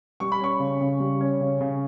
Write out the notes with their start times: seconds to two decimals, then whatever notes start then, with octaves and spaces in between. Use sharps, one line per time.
0.20 G3 C#6
0.32 B5
0.40 C#4 C#6
0.60 C#3
0.81 C#3
1.00 G3
1.21 C#4
1.41 C#3
1.61 C#3